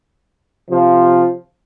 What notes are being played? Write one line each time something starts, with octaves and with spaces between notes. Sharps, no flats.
C3 F3